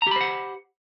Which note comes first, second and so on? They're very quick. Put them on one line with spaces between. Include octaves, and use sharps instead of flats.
A#5 G4 B5 C5 F#5